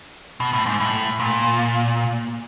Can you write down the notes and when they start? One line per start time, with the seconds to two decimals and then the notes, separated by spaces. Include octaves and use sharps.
0.40 B2
0.53 A2
0.66 G#2
0.80 A2
1.20 A#2